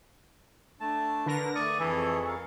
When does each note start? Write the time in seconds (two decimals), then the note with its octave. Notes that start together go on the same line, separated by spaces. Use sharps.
0.80 A3 D4 A5
1.26 D3 A#4 B4 A#6
1.55 A3 D5 C#6 D#6
1.80 F2 E3 E4 G#4 A4
2.28 A#4 F5